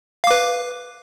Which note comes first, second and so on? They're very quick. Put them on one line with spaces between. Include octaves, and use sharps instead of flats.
F5 D6 B4